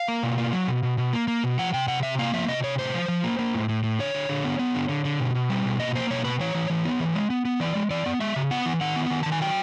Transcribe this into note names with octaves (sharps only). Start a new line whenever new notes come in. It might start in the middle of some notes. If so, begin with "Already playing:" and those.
Already playing: F5
A#3
B2
A#3
F#3
B2
B2
B2
A#3
A#3
B2
F3 F#5
C3 G5
C3 F#5
C3 E5
A#3 F5
F3 E5
C3 D#5
C3 C#5
A2 C5
F3
F3
A#3
A#3
A2
A2
A2
D3 C#5
D3
D3
B3
B3
D3
D3
D3
B2
B2
G3
B2
A#3 D#5
A#3 C5
B2 C#5
B2 B4
E3 C#5
E3
E3
B3
E3
G#3
B3
B3
E3 D5
G#3
E3 D5
B3
G#3 E5
C#3
B3 F#5
E3
D#3 F#5
B3
D#3
D#3 A5
G#5
F#3 G5